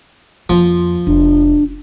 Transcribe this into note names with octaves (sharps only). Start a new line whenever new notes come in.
F2 F3 A#3
F1 D4